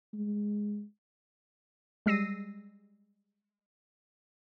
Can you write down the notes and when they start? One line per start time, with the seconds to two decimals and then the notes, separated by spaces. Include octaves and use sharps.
0.13 G#3
2.06 G3 G#3 E6 A#6 C7 D#7